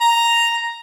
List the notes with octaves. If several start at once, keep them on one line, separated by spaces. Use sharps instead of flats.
A#5